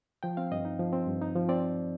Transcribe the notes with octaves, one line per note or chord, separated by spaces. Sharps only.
F3 G5
C4 F5
G2 D#5
D#4
F3
C4
G2
D#4
F3
C4 D5